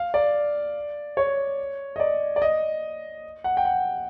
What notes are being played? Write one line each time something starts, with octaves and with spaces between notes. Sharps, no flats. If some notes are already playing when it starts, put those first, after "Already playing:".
Already playing: F5
D5
C#5
D#5
D5
D5
D#5
F#5
G5
F#5